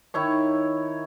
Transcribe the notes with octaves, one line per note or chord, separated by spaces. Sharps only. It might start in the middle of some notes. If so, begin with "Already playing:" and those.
D#3 E4 C#5 C#6